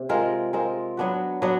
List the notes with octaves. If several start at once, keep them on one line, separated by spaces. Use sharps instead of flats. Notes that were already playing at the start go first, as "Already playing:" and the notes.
Already playing: C3
G#3 C4 F4 A#4
G#3 C4 F4 A#4
F#3 B3 D4 F#4
F#3 B3 D4 F#4